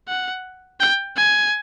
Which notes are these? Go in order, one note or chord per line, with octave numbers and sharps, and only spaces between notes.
F#5
G5
G#5